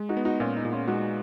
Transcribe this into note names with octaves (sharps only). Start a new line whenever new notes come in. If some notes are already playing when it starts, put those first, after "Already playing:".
Already playing: G#3
D#4 F#4
B3
D#4 F#4
A#2 C#4 F4
D#4
A#2
C#4 F4
G#3 D#4 F#4